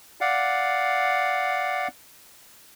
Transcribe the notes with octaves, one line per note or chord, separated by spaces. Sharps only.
D5 F5 F#5